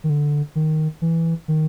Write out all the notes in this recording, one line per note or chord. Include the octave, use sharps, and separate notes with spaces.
D#3
D3
D#3
E3
D#3